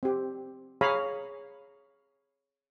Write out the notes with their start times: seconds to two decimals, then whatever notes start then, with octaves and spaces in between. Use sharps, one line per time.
0.03 C4 G4
0.81 G#4 C#5 F5 G#5 A#5 B5